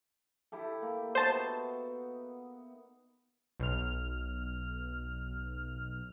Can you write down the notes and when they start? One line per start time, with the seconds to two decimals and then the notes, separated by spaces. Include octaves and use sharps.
0.52 E4 G4 A4
0.82 A#3
1.15 B3 D#4 F#4 C5 A5
3.60 B1 F6